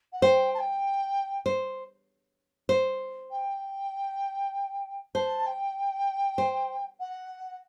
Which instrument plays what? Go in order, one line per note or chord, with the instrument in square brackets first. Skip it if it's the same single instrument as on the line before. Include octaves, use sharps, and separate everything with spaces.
[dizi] F#5
[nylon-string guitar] C5 [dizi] G5
[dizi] A5
G5
[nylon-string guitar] C5
C5
[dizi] G5
[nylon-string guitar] C5 [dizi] A5
[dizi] G5
[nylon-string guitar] C5
[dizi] F#5